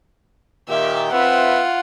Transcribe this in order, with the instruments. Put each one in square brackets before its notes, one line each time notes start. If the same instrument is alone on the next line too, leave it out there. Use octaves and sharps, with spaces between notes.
[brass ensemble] A#2 D#3 G4 [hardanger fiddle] E5
[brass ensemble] C4 B4 E5 [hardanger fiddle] F4 F#5